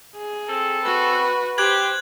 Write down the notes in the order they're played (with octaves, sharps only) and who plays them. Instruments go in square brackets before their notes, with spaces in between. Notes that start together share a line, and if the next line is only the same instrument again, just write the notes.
[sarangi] G#4
[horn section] C4 A4
[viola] F#4 [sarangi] B4
[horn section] G4 [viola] C5 [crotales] F#6 G#6 F#7